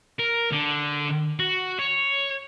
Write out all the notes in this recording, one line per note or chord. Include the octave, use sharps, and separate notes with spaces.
A#4
D3
F#4
C#5